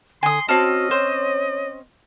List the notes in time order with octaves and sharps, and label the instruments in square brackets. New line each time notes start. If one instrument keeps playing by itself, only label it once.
[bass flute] D3 [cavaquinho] G#5 D#6 [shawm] C6
[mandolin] C4 C#4 [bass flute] F#4 [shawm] D#5 [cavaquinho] A5
[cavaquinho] C5 [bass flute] C#5